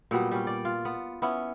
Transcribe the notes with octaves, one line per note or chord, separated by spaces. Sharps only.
A#2 F#3 G3 B3
G3 C#4
D5
F4
B3
B3 C#4 E4